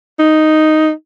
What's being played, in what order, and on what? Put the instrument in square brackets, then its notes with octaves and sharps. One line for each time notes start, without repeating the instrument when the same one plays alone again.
[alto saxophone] D#4